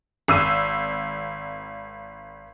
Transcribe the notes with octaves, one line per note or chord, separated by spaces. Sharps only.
G#1 E6 D#7